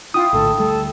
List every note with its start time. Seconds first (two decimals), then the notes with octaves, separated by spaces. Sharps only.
0.14 E4 F4 G5 D#6
0.33 A#1 A2 D3 A4
0.58 D2 G3 A3 A4